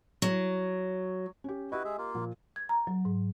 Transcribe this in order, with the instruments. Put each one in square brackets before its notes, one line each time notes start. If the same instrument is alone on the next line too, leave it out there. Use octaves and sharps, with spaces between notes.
[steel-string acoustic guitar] F#3
[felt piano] C#4 G4
[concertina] E4 F#4 B4 [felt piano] G4 D#5
[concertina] G#3 G#4 E5
A#3 F4
[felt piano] A#2 F3
[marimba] G#6
A#5
F#3
G#2